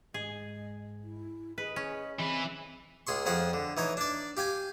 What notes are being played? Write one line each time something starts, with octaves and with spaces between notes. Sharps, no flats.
G#2 G#4 D#5
E4
G#4 B4 D#5
C#4 G#4
E3 C4 G#4 B4
C#2 G#4 C6 C#6
F2 F3 G#4 F#5 C#6
D3
E3 D#4 C#5
D4 D5
G4 F5 G5 G#5